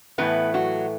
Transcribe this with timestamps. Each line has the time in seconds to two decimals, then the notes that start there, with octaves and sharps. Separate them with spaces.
0.18 A2 E3 A3 B3 B4
0.54 F#3 F#4